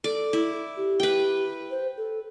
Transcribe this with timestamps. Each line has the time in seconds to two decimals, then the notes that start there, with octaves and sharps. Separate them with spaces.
0.04 A4 D5
0.33 E4
0.77 G4
1.00 B4 G5
1.71 C5
1.97 A4